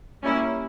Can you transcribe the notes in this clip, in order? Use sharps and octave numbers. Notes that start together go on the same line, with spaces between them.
G3 A#3 C#4 E4